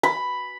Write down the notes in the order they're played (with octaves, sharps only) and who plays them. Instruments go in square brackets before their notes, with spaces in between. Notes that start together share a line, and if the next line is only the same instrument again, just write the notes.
[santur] B5